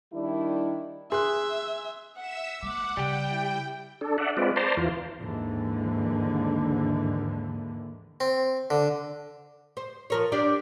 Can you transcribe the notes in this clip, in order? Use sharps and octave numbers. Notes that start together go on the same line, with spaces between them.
D#3 G3 D4 E4
G#4 E5 C6 F#6
E5 F#5 E6
G#3 A#3 F#5 D6
C#3 G3 G4 G5
E4
D4 A4
D5 E5 F#5
G#3 C4 F4 B4 D5
C5 D5 A5 A#5 C6
E2 E3 F4
D#2 G#2 D3 E3
C4
D3
C5
F3 A#4 C#5
D4 G4 D5